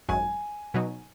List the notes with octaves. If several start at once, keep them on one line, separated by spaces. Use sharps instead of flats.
G#1 F#2 F#3 G#5
B2 F#3 D#4